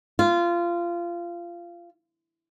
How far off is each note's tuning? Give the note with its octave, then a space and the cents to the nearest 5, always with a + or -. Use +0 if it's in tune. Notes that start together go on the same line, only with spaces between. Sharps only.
F4 -20